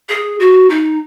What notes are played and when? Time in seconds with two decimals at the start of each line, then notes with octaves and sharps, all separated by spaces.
0.09 G#4
0.40 F#4
0.70 D#4